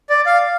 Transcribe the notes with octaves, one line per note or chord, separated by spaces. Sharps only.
D5
F5